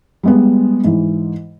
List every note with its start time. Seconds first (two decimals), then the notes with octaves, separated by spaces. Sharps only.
0.23 G3 G#3 B3
0.84 G#2 E3